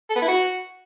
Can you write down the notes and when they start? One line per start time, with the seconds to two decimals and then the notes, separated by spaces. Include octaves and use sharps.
0.10 A4
0.16 B3
0.22 E4
0.28 F#4